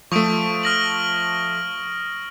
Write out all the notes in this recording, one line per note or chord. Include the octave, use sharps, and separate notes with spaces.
F3 A3 C#6 D#6 D7
F6 A#6 F#7